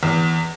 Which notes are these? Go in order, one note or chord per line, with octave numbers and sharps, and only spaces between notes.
E2